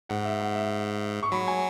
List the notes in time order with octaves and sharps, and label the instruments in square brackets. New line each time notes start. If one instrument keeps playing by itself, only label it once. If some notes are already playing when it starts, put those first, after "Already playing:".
[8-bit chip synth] G#2 [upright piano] F#5
[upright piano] E5
F#5
E5
C#6
[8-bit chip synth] F#3 [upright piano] B5
[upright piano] G#5